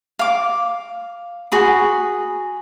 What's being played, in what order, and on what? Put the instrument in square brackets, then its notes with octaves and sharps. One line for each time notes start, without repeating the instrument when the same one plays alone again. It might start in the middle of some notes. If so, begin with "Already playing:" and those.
[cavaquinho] F5 D6
F#4 G#4 B5